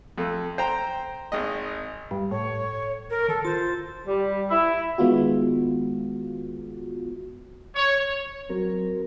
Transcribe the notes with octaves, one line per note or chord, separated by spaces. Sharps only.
F2 A3
C5 G5 A#5
G#1 G#3 D#5
G2
A2 C#5
A#4
D#3 A4
F4 C5 A6
G3
E4
D#3 G#3 B3 F4 F#4
C#5
F#3 C4 A#4